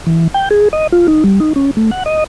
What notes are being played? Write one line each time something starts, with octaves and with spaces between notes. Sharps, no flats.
E3
G5
G#4
D#5
F4
D#4
G3
D#4
C#4
A3
F#5
D#5